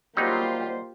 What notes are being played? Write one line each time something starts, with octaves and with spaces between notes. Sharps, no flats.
F#3 G3 A#3 D#4 F4 G4 C5